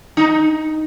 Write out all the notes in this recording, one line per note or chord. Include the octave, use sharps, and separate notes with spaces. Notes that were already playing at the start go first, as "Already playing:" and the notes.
D#4